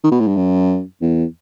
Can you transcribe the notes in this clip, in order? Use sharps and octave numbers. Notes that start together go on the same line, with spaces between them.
D#3
B2
A2
G2
F#2
E2